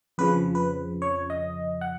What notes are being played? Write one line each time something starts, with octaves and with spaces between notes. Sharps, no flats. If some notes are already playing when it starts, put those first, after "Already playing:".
F2 C#3 F3 B4
B4
C#5
D#5
F#5